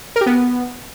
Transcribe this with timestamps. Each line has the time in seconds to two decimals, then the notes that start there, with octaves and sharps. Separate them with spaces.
0.16 A#4
0.21 G4
0.26 B3